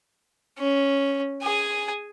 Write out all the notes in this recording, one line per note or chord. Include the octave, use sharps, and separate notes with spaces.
C#4
G#4 G#5